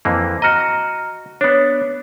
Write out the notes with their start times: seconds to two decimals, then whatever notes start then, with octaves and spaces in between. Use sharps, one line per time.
0.05 F2 E3 A#3
0.42 F#4 D#5 A#5 F6
1.41 B3 D4 C#5